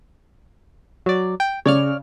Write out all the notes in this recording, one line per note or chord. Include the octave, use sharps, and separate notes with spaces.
F#3 D5
G5
C#3 C#5 D5 F6